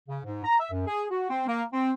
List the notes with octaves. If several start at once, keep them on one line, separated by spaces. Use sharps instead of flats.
C#3
G#2
A#5
E5
F#2
G#4
F#4
C4
A#3
C4